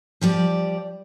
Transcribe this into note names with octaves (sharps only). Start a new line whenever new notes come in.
F3 G3 D5